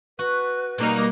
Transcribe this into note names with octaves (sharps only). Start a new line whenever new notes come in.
F#4 B4
B2 G3 A#3 D#4